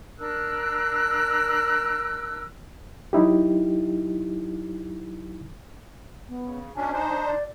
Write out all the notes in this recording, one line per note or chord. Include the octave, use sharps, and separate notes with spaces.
D4 A#4 E6 F#6
F#3 D#4 E4 G4
B3
C#3
B2 C#4 D4 G#5
D4 D#4 C5
D5